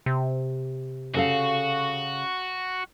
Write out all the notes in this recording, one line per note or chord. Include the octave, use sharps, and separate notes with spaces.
C3
C#3 F#4 A4 F5